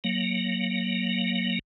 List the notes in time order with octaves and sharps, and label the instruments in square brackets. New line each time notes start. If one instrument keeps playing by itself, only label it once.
[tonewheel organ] F#3 A#3